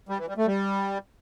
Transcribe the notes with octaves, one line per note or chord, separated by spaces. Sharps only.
G3
E3
G3
A3
G3